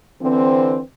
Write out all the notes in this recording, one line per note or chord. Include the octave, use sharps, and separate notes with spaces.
D3 E3 C4